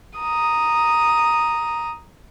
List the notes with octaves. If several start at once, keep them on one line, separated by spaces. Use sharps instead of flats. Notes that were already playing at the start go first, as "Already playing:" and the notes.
A#5 D#6